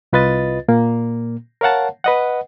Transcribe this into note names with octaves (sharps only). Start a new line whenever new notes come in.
C2 F4 B4 D#5 A6
A#2 A#3
A#4 C#5 F5 F#5 A5
B4 D#5 F#5